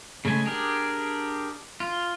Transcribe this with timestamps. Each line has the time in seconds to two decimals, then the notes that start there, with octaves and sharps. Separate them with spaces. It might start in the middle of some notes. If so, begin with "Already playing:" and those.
0.25 C#3 G#3 A3 G#5
0.45 D4 G4 G#4 A#4
1.80 F4